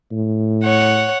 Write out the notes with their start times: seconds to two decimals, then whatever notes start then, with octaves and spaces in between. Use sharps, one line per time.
0.12 A2
0.64 C#5 F#5